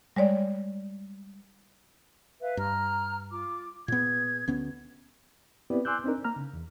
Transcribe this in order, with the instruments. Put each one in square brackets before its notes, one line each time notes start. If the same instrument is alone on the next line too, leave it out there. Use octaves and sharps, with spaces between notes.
[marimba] G3 G#3 C#5 D5
[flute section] B4 E5 F5
[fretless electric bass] G2 [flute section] A#5 F6
[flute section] F4 D6
[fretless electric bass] A#2 B3 [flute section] G#4 G#6
[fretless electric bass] D2 B3 C#4
[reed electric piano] B3 C4 E4 G4 B4 D5
G#5 C6 D6 E6 F#6 G6
C4 D4 D#4 A#4
A#3 A#5 F6
C#3
E2